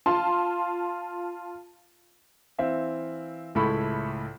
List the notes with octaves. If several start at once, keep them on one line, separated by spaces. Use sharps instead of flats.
F4 A5 C6
E3 C4 E5 F5
C#2 A2 E4 A4 B5 C#6